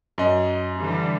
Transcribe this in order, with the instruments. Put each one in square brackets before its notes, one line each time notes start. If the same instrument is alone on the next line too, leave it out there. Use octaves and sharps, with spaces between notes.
[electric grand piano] F#2 D#5
[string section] D3 E3 G3